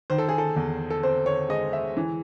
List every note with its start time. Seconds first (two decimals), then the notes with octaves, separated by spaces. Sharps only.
0.10 D#3 C5
0.18 A4
0.29 G#4
0.38 A4
0.56 E2
0.90 A4
1.03 C4 C5
1.26 C#5
1.49 G#3 D#5
1.73 E5
1.97 E3